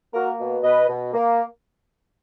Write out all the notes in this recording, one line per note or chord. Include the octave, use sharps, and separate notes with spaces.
A#3 F#4 A#4
B2
B2 B4 D#5
B2
A#3